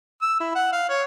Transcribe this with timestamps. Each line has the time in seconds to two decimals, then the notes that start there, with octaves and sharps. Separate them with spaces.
0.22 E6
0.40 E4
0.55 F#5
0.72 F5
0.89 C#5